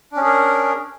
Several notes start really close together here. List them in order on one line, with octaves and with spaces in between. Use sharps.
D4 C#4 G#4 A#4